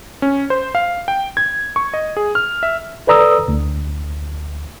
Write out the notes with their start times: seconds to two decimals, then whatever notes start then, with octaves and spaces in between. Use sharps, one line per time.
0.22 C#4
0.50 C5
0.75 F5
1.08 G5
1.37 G#6
1.76 C#6
1.94 D#5
2.17 G#4
2.35 F6
2.63 E5
3.07 A4 B4 D5 A#5 D#6 E6
3.48 D2